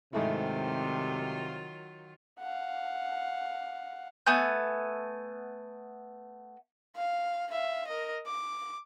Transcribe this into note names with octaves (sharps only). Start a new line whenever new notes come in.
C2 G#2 C3 D#3 F#3 A3 E4 F4
F5 F#5
A3 B3 G#5 G6
F5
E5 F5
A#4 D#5
D6